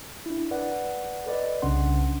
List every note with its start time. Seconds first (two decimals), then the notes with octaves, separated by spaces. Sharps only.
0.26 D4 E4
0.51 B4 D5 F#5
1.26 A4 B4 D5 D#5
1.62 C2 C#3 C#4 D4 F#5 C6